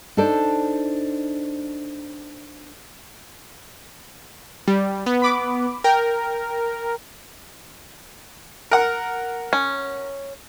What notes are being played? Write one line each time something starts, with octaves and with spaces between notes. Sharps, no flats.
D4 D#4 A4 C5 D5
G3
B3
B5 D6
A#4 G5
A#4 F#5
C#4